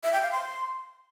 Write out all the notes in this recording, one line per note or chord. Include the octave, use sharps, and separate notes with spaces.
E5
G5
F5
C6